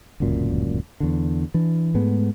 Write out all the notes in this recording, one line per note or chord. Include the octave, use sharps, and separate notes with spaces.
D1 C#2 F#2 A#2
E2 D3
E3 D4
G#2 G#3 A3 B3